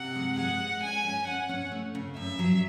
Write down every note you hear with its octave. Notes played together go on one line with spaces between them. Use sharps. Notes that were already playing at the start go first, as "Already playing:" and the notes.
Already playing: C3 F#5
G#3
G#3 F#5
G#3
C#4 G#5
C#4
C#4 F#5
C#4
A3
C#3
F#2 E5
F#3